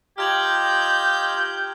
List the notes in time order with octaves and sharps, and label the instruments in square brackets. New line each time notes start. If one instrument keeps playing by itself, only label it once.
[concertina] F4 D#5 A#5 [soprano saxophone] G4 [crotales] F6 G#6 F#7 [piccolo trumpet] G6